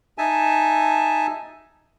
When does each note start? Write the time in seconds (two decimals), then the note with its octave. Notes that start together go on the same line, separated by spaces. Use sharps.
0.18 D#4 E5 G#5 A5